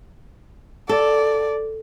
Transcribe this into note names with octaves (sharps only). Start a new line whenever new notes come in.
A4 D5